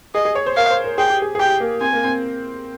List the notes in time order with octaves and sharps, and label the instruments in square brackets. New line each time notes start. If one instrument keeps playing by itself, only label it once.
[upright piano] G#4 [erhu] D#5
[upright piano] G#4
C#5
C5
[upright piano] A#4 [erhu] F5
[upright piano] C5
A#4
[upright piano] G#4 [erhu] G5
[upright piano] G4
G#4
G#4
[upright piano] G4 [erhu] G5
[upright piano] A#3
[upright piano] C4 [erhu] G#5
[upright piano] A#3
C4